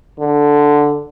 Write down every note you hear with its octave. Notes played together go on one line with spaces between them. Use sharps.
D3